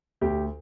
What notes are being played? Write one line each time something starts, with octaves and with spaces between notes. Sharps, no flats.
D2 G4